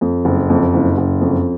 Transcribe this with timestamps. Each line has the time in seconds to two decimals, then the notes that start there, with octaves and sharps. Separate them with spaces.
0.01 F2
0.25 F#1
0.49 F2
0.74 F#1
0.97 F#1
1.21 F2